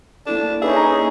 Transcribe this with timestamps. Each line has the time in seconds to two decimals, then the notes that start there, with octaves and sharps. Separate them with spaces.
0.27 A#3 D4 E4 A4
0.62 C#4 D#4 G#4 B4 E5
0.76 A#5